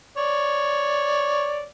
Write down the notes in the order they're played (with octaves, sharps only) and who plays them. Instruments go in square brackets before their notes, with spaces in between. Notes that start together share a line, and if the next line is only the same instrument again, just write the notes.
[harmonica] C#5 D5